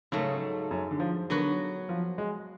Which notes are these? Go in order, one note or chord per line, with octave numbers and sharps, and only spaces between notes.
G#2 C#3 F#3 A3
F#2
D3
F3
D3 F#3 B3 F#4
F3
G#3